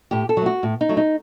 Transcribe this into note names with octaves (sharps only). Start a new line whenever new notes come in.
A2 G4
A4
F#3
A3 F#4
A2
D#4
F#3 A3
D#4